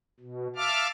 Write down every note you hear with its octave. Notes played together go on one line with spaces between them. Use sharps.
B2
E5 F5 A5 D6 F6